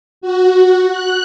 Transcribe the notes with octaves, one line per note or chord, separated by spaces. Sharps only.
F#4
F#6